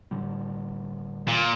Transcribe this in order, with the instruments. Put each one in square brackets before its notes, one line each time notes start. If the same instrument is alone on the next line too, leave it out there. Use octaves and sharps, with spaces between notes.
[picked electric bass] A2 D3 G3
[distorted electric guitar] A#2